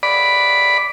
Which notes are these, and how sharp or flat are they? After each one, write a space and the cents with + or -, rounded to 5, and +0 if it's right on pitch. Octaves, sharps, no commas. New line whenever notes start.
D5 +0 B5 +0